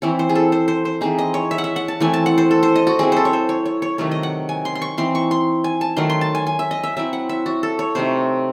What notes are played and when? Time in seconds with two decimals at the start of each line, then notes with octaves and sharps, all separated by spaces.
0.02 E3 C4 E4 C#5
0.19 C5
0.29 G#4
0.35 A4
0.52 C5
0.68 C5
0.85 C5
1.01 E3 C4 D#4 G#4
1.18 D#5
1.34 C#5
1.51 E5
1.58 F#5
1.64 E5
1.76 F#5
1.88 A5
2.00 E3 A3 C4 E4 G#5
2.14 A5
2.26 F#5
2.38 C5
2.51 A4
2.63 C5
2.76 D#5
2.87 F#4
2.99 F#3 C4 E4 G#4
3.12 A4 C5
3.25 C#5
3.33 C5
3.49 C#5
3.66 C#5
3.82 C#5
3.98 C3 D#3 F#3 A3 C#5
4.11 D#5
4.23 F#5
4.49 G#5
4.65 C6
4.75 C6
4.82 C#6
4.98 E3 C4 D#4 C6
5.15 C#6
5.31 C6
5.64 G#5
5.81 A5
5.97 D#3 F#3 A3 C6
6.10 C6
6.21 A5
6.35 G#5
6.47 G#5
6.59 E5
6.71 D#5
6.83 E5
6.97 F#3 C4 E4 E5
7.13 F#5
7.29 E5
7.46 F#4
7.63 A4
7.79 C#5
7.95 C3 F#3 A3 D#4 C5